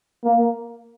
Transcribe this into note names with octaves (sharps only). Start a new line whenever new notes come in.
A#3